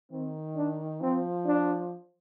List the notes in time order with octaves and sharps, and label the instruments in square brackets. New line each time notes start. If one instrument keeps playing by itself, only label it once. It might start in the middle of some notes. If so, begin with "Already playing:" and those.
[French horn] D#3 [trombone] C4
[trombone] D4
[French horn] F3 [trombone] C4
[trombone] D4